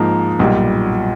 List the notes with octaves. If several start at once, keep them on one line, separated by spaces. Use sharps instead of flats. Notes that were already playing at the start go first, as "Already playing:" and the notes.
Already playing: G#2 F3 A#3 D#4
B1 A#2 G3